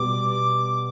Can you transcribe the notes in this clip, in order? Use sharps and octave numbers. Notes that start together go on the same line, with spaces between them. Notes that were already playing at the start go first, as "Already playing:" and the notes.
Already playing: B2 G3 B3 D6
D6